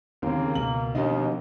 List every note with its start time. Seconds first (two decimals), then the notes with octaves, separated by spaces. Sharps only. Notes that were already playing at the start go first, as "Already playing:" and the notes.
0.23 D#2 C#3 A#3 C4
0.55 C#2 B2 F#7
0.95 D#2 F3 C#4 D4 D#5